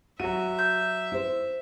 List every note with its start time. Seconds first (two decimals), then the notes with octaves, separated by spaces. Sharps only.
0.20 F#3 F#4 E5 D#7
0.58 G6
1.12 E4 C5